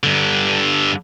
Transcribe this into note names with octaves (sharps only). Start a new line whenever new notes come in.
G2 D3